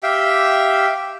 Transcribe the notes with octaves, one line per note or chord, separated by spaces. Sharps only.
G4 E5 F5 G5